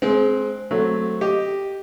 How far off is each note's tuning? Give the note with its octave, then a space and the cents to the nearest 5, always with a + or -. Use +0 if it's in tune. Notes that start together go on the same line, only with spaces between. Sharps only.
G#3 +25 C4 +0
F#3 +0 A3 +0 C4 +0
G4 +0 D#5 +0